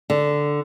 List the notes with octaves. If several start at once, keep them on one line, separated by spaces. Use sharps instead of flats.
D3